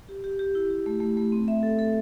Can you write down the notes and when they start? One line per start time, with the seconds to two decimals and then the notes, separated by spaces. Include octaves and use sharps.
0.09 G4
0.24 G4
0.39 G4
0.55 E4
0.70 G4
0.86 A3
1.00 A3
1.17 A3
1.32 C4
1.48 E5
1.63 A4
1.79 A4